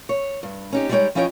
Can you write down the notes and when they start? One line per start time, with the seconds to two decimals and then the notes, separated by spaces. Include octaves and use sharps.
0.09 C#5
0.43 G2
0.73 C#4 D#4 G4
0.89 G3 G#3 D#4 G#4 C#5 G5
1.15 F3 C#4 E4 C#5 D#5 G5